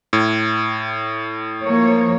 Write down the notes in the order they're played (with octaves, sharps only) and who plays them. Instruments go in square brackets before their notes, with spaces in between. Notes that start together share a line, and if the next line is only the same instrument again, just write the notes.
[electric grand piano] A2
[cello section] F3 A#3 C#5